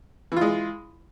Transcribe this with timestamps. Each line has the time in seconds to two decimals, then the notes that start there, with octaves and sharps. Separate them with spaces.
0.32 E3
0.36 F4
0.41 G#3